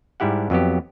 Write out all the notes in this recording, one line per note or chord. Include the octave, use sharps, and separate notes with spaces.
G#2 G3 E4 G4 F#5
F2 F#3 B3 G4